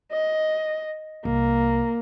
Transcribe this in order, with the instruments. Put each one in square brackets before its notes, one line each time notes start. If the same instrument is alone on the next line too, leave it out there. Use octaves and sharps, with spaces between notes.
[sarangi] D#5
[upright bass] C2 [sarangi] A#3